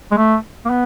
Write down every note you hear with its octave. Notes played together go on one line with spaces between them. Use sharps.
G#3
A3
A#3
B3